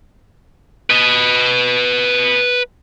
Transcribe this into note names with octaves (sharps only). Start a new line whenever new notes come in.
B4 D#5